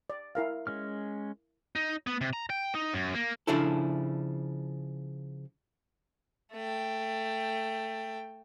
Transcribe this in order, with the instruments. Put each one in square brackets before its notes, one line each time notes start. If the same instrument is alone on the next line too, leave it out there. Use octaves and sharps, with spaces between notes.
[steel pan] D5
E4 A#4 F5
[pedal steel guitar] G#3 C#4 F6
[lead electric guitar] D#4
B3
C3
A#5
G5
D#4
F#2
A#3
[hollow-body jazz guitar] C#3 F3 D4 E4 A4
[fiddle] A3 G5